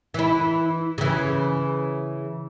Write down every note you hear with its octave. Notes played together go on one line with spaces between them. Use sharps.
E3 E4
C#3 E3